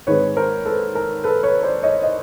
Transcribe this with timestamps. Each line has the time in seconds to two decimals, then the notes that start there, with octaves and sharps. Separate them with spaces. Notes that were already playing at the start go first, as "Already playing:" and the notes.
0.07 G#2 D#3 G#3 C4 B4 C#5
0.37 A#4 C5
0.66 A4 B4
0.95 A#4
1.24 A4 B4
1.43 B4 C#5
1.63 C5 D5
1.83 C#5 D#5
2.03 D#5